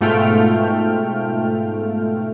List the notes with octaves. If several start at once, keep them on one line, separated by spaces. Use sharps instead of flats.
G#2 B2 A3 F4 G5 F6